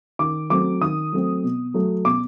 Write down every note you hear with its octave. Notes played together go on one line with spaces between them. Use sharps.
D#3 D6
F#3 A3 C4 D6
D#3 D#6
F#3 A3 C4
B2
F#3 A3
B2 D6